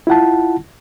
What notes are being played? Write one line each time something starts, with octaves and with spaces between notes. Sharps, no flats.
E4 F4 F#5 A5